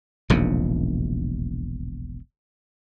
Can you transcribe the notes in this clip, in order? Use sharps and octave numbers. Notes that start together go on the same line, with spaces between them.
E1 A#1 D#2 C#3